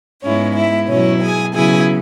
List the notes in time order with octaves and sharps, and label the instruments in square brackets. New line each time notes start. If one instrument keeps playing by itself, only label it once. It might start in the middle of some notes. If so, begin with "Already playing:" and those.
[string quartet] G#2 G#3 B3 C#4 E4 C#5
E4 E5
B2 F#3 C#4 E4 C#5
G#4 G#5
C#3 F#3 B3 E4 G#4 G#5